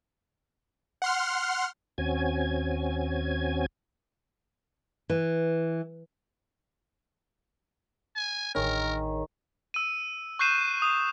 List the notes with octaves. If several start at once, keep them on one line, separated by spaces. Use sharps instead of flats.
F#5 C6 F6
D#2 C4 C#4 F#4 G#5 G#6
E3
G#5
A1 D#3 G#4 A#4 C#5
E6 D#7
C#6 F#6 G6 C7 D#7 E7
D#6